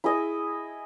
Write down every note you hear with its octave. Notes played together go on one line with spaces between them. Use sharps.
E4 G#4 D#5